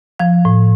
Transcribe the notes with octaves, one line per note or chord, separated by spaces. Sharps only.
F3 F5
A2